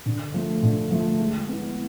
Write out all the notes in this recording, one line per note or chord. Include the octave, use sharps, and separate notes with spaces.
D3
F3 A3
D3
F3 A3
G#3
B3 E4